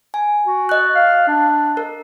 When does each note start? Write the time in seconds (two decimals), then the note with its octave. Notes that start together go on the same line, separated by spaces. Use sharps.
0.14 G#5
0.46 F#4
0.69 D#5 F#6
0.95 F5
1.28 D4
1.77 A#4